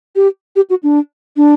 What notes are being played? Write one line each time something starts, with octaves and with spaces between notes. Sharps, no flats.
G4
G4
F#4
D4
D4